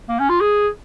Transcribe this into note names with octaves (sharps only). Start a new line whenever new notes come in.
A#3
C#4
F4
G#4